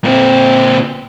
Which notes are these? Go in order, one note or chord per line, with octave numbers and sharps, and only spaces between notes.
A#2 C4